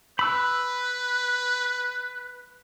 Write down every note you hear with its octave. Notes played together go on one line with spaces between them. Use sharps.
B4 B5 E6